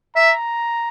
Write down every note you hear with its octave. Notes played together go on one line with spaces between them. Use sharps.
E5 A#5